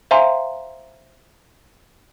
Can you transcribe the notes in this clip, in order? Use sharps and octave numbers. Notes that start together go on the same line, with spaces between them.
C5 E5 F5 G#5 A#5 C6